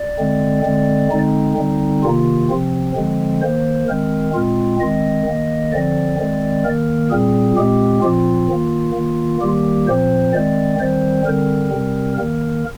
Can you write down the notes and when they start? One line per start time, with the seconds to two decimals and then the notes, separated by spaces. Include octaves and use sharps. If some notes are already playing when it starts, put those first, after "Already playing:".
Already playing: D5
0.19 D3 G#3 C4
0.65 D3 G#3 C4
1.11 D3 G#3 C4 D#4
1.57 D3 G3 C4
2.04 C3 D#3 A#3 F4
2.50 C3 F3 C4
2.96 D3 F3 G#3 C4
3.42 D#3 A#3 C5
3.88 D#3 G#3 C4 A#4
4.34 A#2 G#3 C4 F4
4.80 D#3 G#3 C4 D#5
5.26 D#3 A#3
5.72 D3 F3 C4 D5
6.18 D#3 G#3 C4
6.64 D#3 A#3 A#4
7.10 A#2 G3 C4 G#4
7.57 A#2 G#3 C4 G4
8.03 A#2 F3 C4 F4
8.49 D#3 A#3
8.95 D#3 A#3
9.41 D#3 G3 A#3 G4
9.87 A#2 F3 C4 C5
10.33 D#3 G#3 C4 D5
10.79 D#3 G3 C4 C5
11.26 D3 G3 C4 A#4
11.71 C3 G3 C4
12.17 D#3 A#3 A#4